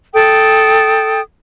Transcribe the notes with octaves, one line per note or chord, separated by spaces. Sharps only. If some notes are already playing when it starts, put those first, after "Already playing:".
A4 G5 D#6